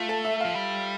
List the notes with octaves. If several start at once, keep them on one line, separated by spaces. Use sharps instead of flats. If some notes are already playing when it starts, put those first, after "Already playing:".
Already playing: A3 F4
A4
E5
F3 F5
G3